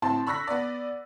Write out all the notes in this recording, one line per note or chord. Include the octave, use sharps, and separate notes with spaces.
A2 C4 A5 C6
B5 C#6 E6 F#6 A#6 B6
B3 D5